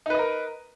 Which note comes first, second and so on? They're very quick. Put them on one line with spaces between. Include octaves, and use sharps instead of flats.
D#4 B4 D#5 A#4